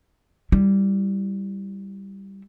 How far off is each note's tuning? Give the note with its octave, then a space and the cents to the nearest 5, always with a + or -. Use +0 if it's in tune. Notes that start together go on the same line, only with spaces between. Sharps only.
G3 -5 E4 +0